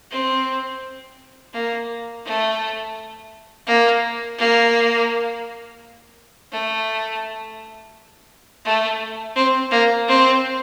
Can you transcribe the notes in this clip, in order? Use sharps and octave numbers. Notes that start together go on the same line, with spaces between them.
C4
A#3
A3
A#3
A#3
A3
A3
C4
A#3
C4